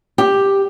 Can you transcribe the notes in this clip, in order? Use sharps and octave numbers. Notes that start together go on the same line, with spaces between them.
G4